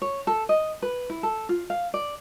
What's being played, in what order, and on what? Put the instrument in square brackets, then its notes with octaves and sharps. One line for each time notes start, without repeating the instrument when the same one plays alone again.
[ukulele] C#5
A4
D#5
B4
E4
A4
F4
F5
D5